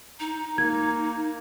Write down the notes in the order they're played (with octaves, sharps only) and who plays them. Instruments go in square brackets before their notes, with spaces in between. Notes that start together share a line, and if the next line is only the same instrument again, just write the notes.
[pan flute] D#4 [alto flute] A#5
[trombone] A#3 [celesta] G#6